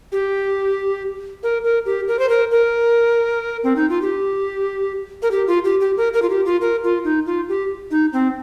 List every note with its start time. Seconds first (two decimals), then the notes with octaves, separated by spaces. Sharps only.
0.12 G4
1.43 A#4
1.64 A#4
1.86 G4
2.08 A#4
2.19 C5
2.29 A#4
2.51 A#4
3.63 C4
3.76 D#4
3.89 F4
4.02 G4
5.22 A#4
5.31 G4
5.48 F4
5.64 G4
5.81 G4
5.97 A#4
6.14 A#4
6.22 F4
6.30 G4
6.46 F4
6.61 A#4
6.84 F4
7.04 D#4
7.26 F4
7.49 G4
7.91 D#4
8.13 C4